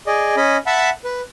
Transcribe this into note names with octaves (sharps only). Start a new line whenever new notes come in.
G#4 D5 D#5
C#4 D#5 B5
E5 F#5 A5 B5
B4